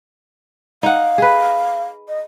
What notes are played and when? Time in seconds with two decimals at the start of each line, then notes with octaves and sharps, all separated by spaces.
0.83 D#4 F5 F#5
1.18 G#4 B4
2.08 D#5